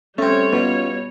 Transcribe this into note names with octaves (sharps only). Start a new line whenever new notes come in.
G3 A3 C4 C#4 C#5
B2 B3 C#4 F4